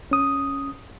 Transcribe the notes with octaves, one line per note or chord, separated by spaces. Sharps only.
C#4 D#6